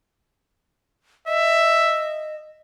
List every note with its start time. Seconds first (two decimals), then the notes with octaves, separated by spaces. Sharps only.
1.28 D#5 E5